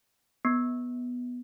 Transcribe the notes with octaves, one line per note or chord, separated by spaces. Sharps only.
B3